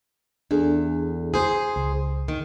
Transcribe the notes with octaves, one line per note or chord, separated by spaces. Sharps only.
E2 D4 G#4 A4
G#4 C5 D#6
C#2
D#3